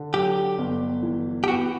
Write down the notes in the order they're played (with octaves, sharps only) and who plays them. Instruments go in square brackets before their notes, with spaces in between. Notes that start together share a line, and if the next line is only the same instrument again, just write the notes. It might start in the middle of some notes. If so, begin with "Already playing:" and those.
Already playing: [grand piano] D3
[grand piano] F#3 [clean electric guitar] G4
[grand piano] G1
E3
[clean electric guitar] G4
[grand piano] B3 [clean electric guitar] F#4